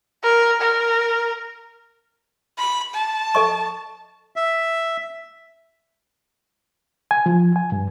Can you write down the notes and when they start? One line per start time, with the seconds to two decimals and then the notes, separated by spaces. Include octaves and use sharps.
0.24 A#4
0.61 A#4
2.58 B5
2.94 A5
3.35 A4 D#5 C#6
4.36 E5
7.11 G#5
7.26 F3
7.56 G#5
7.72 G2